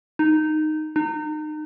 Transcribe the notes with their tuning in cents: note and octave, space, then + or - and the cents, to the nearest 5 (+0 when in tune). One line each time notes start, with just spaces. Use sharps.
D#4 -10
D#4 -30